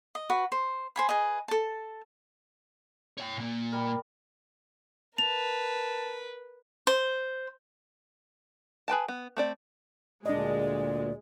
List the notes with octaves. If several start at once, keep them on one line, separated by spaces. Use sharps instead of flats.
D#5
F#4 B4
C5
C5 G#5 B5
G#4 B4 D#5
A4 A5
C#5 G5
A#2 A#3
G3 A#4
A#4 B4 A5 F7
C5
G#4 B4 G5 A5
B3
A3 C4 D5
D2 A#2 G#3 D4 D5 D#5